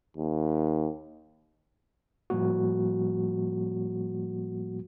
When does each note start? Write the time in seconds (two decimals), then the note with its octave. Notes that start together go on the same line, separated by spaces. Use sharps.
0.17 D#2
2.30 A2 F3 G3 A#3 F#4